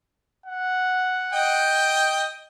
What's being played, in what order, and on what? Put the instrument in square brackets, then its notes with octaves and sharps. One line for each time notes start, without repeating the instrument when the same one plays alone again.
[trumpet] F#5
[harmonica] D#5 G5